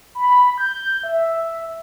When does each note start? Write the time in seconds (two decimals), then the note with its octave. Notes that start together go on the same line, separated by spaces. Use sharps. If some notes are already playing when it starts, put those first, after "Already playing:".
0.15 B5
0.58 G6
1.03 E5